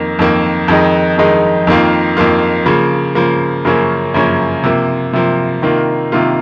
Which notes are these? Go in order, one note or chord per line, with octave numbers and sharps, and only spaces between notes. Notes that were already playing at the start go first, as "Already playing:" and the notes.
Already playing: F2 D#3 A#3
F2 D#3 A#3
F2 D#3 G#3 D#4
F2 D#3 G#3 D#4
F2 D#3 A#3 F4
F2 D#3 A#3 F4
C#3 F3 A#3
C#3 F3 A#3
F#2 C#3 F3 A#3 C#4
F#2 C#3 F3 A#3 C#4
C3 F3 A#3
C3 F3 A#3
C3 D#3 A#3 F4
C3 D#3 A#3 F4